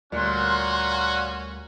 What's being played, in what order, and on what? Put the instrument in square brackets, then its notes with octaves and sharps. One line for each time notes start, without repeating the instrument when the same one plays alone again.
[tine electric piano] D2 G3 A3 [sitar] A#2 [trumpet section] C#4 F#4 [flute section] C6 F#6